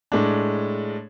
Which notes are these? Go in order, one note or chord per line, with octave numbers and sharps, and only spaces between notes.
A2 G#3 D4